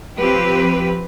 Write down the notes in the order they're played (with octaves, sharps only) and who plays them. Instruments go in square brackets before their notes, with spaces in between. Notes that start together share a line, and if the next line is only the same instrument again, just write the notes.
[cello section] F3 C4 G4 B4